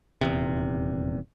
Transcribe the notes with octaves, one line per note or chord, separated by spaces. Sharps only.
D#1 E2 C3